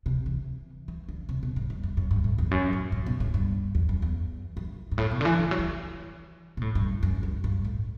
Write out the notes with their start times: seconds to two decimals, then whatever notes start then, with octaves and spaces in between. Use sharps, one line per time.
0.06 C3
0.26 E3
0.88 E3
1.09 D3
1.29 C3
1.43 B2
1.56 A2
1.70 G2
1.83 F#2
1.97 F#2
2.11 G2
2.24 A2
2.38 E2
2.51 F#2
2.73 A2
2.92 A2
3.06 B2
3.20 A2
3.34 G2
3.75 E2
3.89 F#2
4.02 E2
4.57 F#2
4.91 G2
4.98 A2
5.11 B2
5.21 D3
5.25 E3
5.39 E3
5.51 F#3
5.59 E3
6.57 B2
6.61 A2
6.75 G2
7.03 F#2
7.23 F#2
7.44 G2
7.65 A2